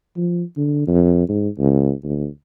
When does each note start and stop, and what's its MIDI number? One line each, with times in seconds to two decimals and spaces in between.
0.17 0.43 53
0.57 0.87 50
0.87 1.25 41
1.29 1.49 44
1.59 1.92 37
2.04 2.28 38